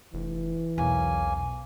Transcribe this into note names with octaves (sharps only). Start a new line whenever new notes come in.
F1 E3
B1 E2 A#3 C#4 G#5